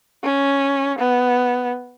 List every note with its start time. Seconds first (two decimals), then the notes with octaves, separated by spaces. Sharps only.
0.23 C#4
0.99 B3